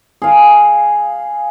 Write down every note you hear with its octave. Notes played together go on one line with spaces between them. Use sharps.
G#4 F5